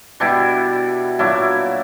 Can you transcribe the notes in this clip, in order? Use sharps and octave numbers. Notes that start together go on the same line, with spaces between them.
B2 G3 D4 E4
A#2 F#3 D4 E4